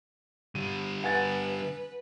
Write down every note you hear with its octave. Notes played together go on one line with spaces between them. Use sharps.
D3 G3 D#7
B4 F#5 G#5 A6